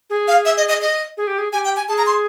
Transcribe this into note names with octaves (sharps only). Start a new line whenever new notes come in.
G#4
F5
E5
D#5
D#5
D#5
G#4
G4
G#4
G4 G#5
G5
G#5
G#4 A5
A#5
C6